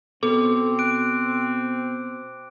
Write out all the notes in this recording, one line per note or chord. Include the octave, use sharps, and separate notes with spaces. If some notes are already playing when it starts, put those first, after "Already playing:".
B2 C4 A4 D6
F#6 D7